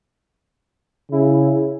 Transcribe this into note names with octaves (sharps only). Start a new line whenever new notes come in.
C#3 E4